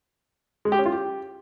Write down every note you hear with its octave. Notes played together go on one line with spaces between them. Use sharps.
G#3
G4
C#4
F4
G4